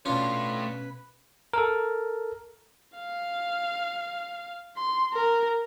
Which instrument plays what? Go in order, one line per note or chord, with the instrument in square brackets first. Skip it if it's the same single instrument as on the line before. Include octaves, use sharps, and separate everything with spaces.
[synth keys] B2 C#4 [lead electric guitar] A3 C#5 [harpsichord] D4 F4 [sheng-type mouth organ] B4
[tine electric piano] A4 A#4
[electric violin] F5
C6
A#4